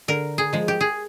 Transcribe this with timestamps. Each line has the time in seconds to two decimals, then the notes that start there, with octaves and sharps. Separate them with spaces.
0.08 D3 A#4
0.38 G#4
0.53 F3 G#3
0.68 G4
0.81 G#4